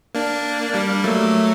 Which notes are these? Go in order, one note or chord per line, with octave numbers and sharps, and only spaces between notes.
A#3 D4
G3 A#3
F#3 A3